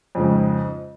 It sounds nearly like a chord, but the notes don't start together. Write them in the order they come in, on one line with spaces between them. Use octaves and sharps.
F2 C#3 G#2